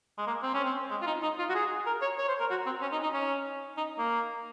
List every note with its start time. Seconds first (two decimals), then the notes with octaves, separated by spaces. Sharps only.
0.18 G#3
0.27 A#3
0.43 C4
0.54 C#4
0.65 C4
0.91 G#3
1.02 F4
1.07 D#4
1.23 D#4
1.39 F4
1.50 F#4
1.55 G#4
1.86 A#4
2.02 C#5
2.18 C#5
2.28 C5
2.40 A#4
2.50 F#4
2.66 C4
2.82 C#4
2.92 D#4
3.03 D#4
3.14 C#4
3.77 D#4
3.98 A#3